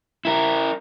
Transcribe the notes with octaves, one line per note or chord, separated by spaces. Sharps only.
E4 A#4